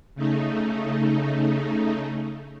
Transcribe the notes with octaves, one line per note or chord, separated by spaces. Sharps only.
C#3 A3 D#4